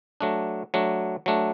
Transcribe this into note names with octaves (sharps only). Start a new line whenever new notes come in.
F#3 A3 D4
F#3 A3 D4
F#3 A3 D4